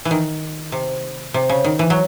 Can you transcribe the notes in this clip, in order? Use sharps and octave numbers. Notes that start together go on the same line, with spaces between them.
E3
D#3
C3
C3
C#3
D#3
E3
F#3